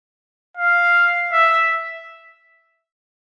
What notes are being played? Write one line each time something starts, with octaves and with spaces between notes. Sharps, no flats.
F5
E5